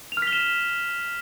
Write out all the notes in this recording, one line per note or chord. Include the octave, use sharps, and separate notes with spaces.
F7
F6
B6
G7
E7